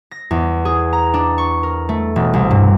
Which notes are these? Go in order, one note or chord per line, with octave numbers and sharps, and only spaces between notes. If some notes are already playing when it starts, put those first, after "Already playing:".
A#6
E2
G#4
A#5
D4
C#6
A#4
A3
E1
C2
G2